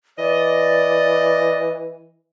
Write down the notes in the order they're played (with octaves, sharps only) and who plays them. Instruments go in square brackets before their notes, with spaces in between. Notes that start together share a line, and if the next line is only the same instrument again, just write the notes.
[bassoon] E3 [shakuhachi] D5 [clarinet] D#5